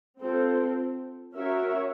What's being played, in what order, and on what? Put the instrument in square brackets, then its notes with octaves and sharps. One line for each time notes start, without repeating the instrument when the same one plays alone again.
[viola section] C4 F4 A4 C5
C#4 F#4 A#4 C#5 E5